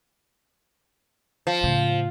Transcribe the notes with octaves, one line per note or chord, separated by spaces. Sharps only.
F3
A2 C#3